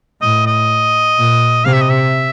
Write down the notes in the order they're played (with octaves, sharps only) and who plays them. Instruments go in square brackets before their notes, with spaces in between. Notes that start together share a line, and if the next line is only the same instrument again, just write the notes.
[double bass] A2 [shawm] D#5
[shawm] D#5
[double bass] A#2
[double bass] C3 [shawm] F5
[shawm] E5
D#5
E5